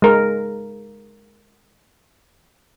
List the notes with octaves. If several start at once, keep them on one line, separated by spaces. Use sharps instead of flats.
G#3 A#4